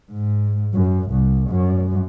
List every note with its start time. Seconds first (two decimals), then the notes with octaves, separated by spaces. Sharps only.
0.12 G#2
0.74 F#2
1.10 C2
1.50 F#2